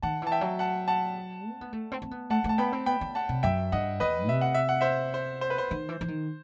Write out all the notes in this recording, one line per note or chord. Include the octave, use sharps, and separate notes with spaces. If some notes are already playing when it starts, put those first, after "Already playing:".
D#3 F#5 A5
E3 A5
E5 G5
F#3
F#5 A5
F#5 A5
C4
B3
A3
C4
C4
B3
A3 F#5 A5
A3
A5
B3 G5 B5
C4
B3 G5 B5
B3
F#5 A5
C3
F#2 E5 G5
G2 D#5 F#5
E2 B4 D#5
C3 E5
F#5
E5
F#5
C5 E5
C5
C5
B4
C5
D#3
E3
E3
D#3